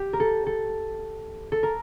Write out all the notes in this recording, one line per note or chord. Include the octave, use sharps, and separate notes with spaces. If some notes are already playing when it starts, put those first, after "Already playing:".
Already playing: G4
A#4
A4
A4
A4
A#4